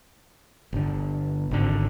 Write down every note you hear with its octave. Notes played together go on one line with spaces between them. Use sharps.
G1 D3
G#1 D3